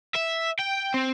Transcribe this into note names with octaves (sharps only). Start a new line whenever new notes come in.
E5
G5
C4